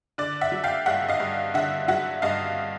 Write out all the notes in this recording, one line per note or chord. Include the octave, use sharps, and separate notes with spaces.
D3 D5
E5 F#5
F#3
F5 G5
G2 E5 F#5
D#5 F5
G2
D3 E5 F#5
F#3 E5 F#5
G2 D#5 F5